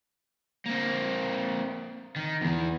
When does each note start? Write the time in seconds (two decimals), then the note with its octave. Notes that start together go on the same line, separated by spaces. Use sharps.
0.66 A#3 C4
2.16 D#3
2.41 E2 E3